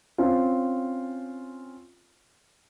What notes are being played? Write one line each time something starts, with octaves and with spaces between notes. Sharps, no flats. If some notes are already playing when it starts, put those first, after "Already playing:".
C4 C#4 F4